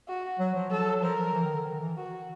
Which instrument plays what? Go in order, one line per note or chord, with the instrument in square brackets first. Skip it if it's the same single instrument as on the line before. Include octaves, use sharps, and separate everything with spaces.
[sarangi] F#4
[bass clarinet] F#3
F3
[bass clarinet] F#3 [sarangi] A4
[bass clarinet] F3 [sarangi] A#4
[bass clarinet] F3
E3
D#3
D3
D#3
E3
[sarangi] F#4